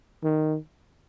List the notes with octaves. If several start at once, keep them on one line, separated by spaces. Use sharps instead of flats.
D#3